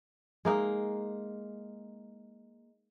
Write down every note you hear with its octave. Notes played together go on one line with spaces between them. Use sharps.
G#3 A#3 D#4